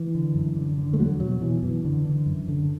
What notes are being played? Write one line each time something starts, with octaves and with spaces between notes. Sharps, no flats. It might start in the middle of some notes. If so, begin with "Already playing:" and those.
Already playing: E3
D3
F#2
D3
D3
A3
E2 F#3
B2 F#3
B2 E3
F#2 E3
D3
D3
F#2
D3